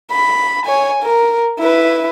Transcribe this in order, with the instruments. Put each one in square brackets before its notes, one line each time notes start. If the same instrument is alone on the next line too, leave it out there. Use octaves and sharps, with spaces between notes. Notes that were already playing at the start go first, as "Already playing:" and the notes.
[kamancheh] B5
C#5 G#5
A#4
E4 B4